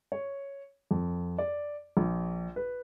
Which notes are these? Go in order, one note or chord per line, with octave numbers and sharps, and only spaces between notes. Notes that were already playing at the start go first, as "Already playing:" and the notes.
C#5
F2
D5
A#1
B4